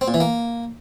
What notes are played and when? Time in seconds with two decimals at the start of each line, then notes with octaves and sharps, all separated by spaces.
0.01 C4
0.08 A#2
0.14 E3
0.20 A#3